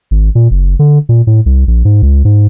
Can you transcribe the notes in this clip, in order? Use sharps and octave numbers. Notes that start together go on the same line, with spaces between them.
G#1
A#2
F#1
D3
A#2
A2
C2
A#1
G#2
C#2
G#2